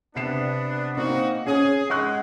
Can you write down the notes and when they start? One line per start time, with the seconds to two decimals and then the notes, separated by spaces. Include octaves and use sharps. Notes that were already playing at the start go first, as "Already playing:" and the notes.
0.16 C3 B3 D4 C7 E7
0.97 A#3 C4 D#4 F#4
1.47 C#4 G#4
1.90 G#3 F#5 C#6 F#6